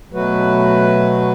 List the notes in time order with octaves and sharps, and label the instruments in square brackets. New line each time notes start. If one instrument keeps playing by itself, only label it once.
[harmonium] B2 F#3 A3 F#4 B4